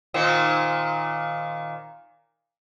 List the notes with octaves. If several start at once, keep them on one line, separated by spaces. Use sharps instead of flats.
A#2 D#3 C4